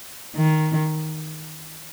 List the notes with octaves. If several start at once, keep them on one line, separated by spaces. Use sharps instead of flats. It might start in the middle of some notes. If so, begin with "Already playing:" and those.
D#3